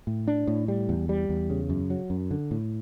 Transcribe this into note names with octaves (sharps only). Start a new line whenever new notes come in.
A2
D4
A2
G3
E2
G3
E2
C#3
F#2
F#3
F#2
D3
A2